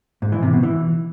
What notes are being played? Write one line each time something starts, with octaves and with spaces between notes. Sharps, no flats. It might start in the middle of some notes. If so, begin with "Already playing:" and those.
G#2
E3
C3
B2
E3